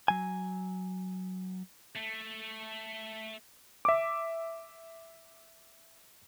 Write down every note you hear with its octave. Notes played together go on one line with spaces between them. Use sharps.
F#3 G#5
A3
E5 D6